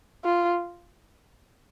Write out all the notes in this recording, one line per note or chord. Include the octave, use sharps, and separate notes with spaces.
F4